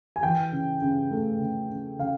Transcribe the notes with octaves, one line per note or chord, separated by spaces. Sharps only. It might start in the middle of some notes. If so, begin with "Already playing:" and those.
G#5
E3 G5
C#3
C#3
A3
C#3
C#3
C#3 F5